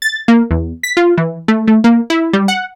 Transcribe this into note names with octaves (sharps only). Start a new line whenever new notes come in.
A6
A#3
E2
B6
F4
E3
A3
A3
A#3
E4
G3
F#5